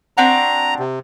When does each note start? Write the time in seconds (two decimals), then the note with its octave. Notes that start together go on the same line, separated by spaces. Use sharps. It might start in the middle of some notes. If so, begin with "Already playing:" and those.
0.17 C4 D4 F#4 A#5
0.79 C3